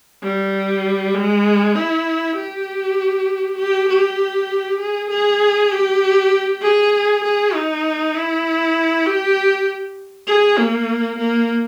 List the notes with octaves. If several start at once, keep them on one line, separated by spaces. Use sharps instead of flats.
G3
G#3
E4
G4
G4
G4
G#4
G#4
G4
G#4
G#4
D#4
E4
G4
G#4
A#3
A#3